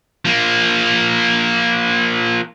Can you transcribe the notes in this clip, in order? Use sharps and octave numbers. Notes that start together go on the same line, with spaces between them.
F3 A#3